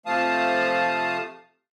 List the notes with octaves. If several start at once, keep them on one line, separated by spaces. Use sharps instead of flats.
C3 F3 A3 F5 A5 D#6